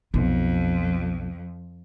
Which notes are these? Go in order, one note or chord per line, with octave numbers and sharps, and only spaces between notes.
B1 F2 F4